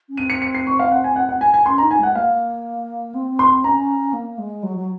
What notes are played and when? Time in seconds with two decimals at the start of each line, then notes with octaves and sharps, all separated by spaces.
0.09 C#4
0.17 C4 D#7
0.30 C#7
0.42 C#7
0.54 C7
0.67 C#6
0.79 F5
0.91 F#5
1.04 G#5
1.16 F#5
1.29 F#5
1.41 G#5
1.54 G#5
1.66 C#4 C6
1.78 A#5
1.83 D#4
1.91 G#5
1.99 G#3 F#5
2.15 A#3 F5
3.15 C4
3.39 C6
3.64 C#4 A#5
4.13 A#3
4.38 G#3
4.63 F#3
4.77 F#3